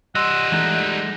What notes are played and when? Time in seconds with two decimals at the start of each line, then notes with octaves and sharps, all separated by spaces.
0.15 G3 D#5 F#5 C6 E6 F#6
0.52 E3 G#3 A3 D#4